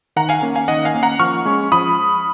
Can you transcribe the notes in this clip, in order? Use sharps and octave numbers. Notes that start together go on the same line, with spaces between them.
D#3 F#5 A#5
F5 G#5
A#3 C#4
F5 G#5
D#3 D#5 F#5
F5 G#5
A#3 C#4
F#5 A#5
F3 C#6 F6
G#3 C#4
F3 B5 D#6